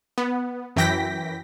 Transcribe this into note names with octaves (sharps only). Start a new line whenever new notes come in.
B3
F#2 E3 G5 A#6 B6